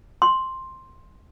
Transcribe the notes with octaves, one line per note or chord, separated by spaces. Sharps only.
C6